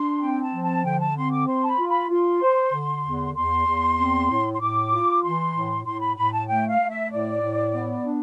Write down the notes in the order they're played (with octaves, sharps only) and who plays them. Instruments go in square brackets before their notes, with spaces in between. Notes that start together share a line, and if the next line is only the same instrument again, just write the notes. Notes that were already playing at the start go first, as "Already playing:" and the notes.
Already playing: [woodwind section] D4 [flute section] C6
[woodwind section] C4 [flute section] G5
[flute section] A5
[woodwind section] F3
[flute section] A5
[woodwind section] D3 [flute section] G5
[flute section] A5
[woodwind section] C4 [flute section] C6
[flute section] D6
[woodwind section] C5 [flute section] C6
[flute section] A5
B5
[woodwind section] F4
[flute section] B5
[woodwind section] F4 [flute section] C6
[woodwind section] C5
D3
E2
[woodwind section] E2 [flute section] C6
[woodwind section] E2
C4
A2
[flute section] C6
[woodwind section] A2 [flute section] D6
[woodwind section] F4
[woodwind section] E3 [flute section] C6
[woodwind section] A2
[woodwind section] A2 [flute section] C6
[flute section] B5
[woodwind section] A2 [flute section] B5
[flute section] A5
[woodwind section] A3 [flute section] G5
[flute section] F5
[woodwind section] A3
[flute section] E5
[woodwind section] A2 [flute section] D5
[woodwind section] A2
B3
D4